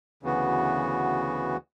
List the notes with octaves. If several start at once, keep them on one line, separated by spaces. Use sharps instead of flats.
D2 C#3 E3 B3 F#4